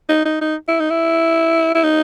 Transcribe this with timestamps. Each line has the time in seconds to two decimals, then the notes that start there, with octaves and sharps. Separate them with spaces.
0.09 D#4
0.25 D#4
0.41 D#4
0.68 E4
0.80 D#4
0.90 E4
1.75 E4
1.83 D#4